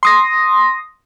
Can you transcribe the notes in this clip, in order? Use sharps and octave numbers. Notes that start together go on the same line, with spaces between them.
C6 D#6 A#6